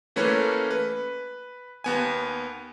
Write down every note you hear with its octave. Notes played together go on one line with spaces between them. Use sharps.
E3 A3 A#3 C#4 B4 C#5
B4
D#2 B3 G#5